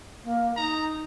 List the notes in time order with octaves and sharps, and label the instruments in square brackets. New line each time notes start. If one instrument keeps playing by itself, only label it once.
[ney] A#3
[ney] D#4 [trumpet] A#5